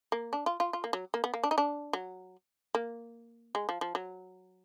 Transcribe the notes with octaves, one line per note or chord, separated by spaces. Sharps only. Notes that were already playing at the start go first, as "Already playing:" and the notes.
A#3
D4
F4
F4
F4
A#3
F#3
A#3
B3
A#3
D4
D#4
D4
F#3
A#3
G#3
F3
F3
F#3